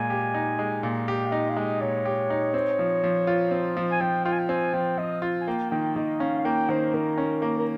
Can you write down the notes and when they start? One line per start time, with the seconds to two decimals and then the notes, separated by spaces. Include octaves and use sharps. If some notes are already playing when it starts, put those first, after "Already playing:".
Already playing: A#2 G#3 G#5
0.10 G4
0.34 D#4
0.59 G#3
0.83 A#2
1.08 G4 G5
1.26 F5
1.32 D#4 D#5
1.49 F5
1.56 G#3 D#5
1.80 A#2 C#5
2.05 G4
2.30 D#4
2.54 C4
2.79 F3
3.04 F3
3.27 F4
3.51 C4
3.77 F3
3.91 G#5
4.00 F3 G5
4.24 F4 G5
4.32 G#5
4.39 G5
4.49 C4 G#5
4.73 F3 G5
4.98 F3 D#5
5.22 F4
5.41 G#5
5.48 A#3 G5
5.71 D#3 G5
5.96 D#3 D#5
6.20 C#4 F5
6.38 F5
6.45 A#3 G5
6.69 D#3 C5
6.94 D#3 A#4
7.18 C#4
7.42 A#3
7.58 A#4